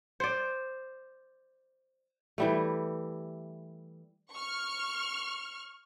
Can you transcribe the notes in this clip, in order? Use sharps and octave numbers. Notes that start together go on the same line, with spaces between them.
C5 D5
E3 G3 A3
C#6 F6